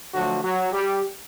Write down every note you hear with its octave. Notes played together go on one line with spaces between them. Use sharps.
D3 F3 F#3 A3 F#4
F#3 F#4
G3 G4